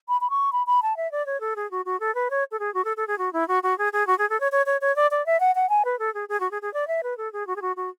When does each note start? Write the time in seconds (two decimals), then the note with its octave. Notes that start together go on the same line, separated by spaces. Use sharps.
0.08 B5
0.21 B5
0.30 C#6
0.52 B5
0.67 B5
0.82 A5
0.97 E5
1.12 D5
1.26 C#5
1.40 A4
1.56 G#4
1.71 F#4
1.85 F#4
2.00 A4
2.15 B4
2.30 C#5
2.51 A4
2.60 G#4
2.74 F#4
2.85 A4
2.97 A4
3.08 G#4
3.18 F#4
3.33 E4
3.48 F#4
3.63 F#4
3.78 G#4
3.93 G#4
4.07 F#4
4.18 G#4
4.30 A4
4.40 C#5
4.52 C#5
4.66 C#5
4.81 C#5
4.96 D5
5.11 D5
5.26 E5
5.40 F#5
5.55 F#5
5.69 G#5
5.85 B4
5.99 A4
6.14 G#4
6.29 G#4
6.40 F#4
6.51 G#4
6.62 G#4
6.74 D5
6.88 E5
7.03 B4
7.17 A4
7.33 G#4
7.47 F#4
7.56 G#4
7.62 F#4
7.76 F#4